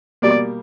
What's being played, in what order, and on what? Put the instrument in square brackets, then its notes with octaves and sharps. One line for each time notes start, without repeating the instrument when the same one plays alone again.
[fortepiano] B2 G3 A#3 [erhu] D5